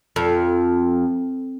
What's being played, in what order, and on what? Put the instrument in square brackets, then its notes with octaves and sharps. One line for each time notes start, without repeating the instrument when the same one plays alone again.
[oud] F2